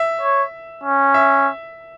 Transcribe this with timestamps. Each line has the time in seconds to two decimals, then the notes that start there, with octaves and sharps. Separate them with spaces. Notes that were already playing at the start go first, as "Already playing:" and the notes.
Already playing: E5
0.21 C#5
0.84 C#4
1.14 E5